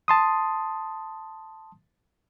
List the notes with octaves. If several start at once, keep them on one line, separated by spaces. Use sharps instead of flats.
A5 C6 D#6